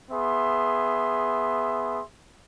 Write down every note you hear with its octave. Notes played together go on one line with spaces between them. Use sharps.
B3 G#4 E5 C6